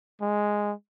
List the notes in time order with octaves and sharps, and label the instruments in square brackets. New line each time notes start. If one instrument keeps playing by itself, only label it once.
[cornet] G#3